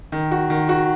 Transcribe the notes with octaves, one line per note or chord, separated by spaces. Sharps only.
D#3
F#4
D#3
F#4